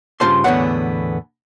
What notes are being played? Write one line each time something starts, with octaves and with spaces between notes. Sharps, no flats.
G2 C#3 F4 C5 A5 C6
E2 A2 D3 B3 C#5 F#5